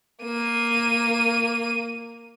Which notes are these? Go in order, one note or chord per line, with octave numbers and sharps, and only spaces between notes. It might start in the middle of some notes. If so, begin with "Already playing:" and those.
A#3 D#7